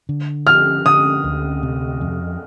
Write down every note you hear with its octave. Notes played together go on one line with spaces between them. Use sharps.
D3
F3 F6
D3 D#6
D2
C3
F2